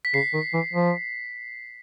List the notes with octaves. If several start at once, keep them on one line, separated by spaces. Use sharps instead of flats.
B6
C#3 C7
D#3
E3
F3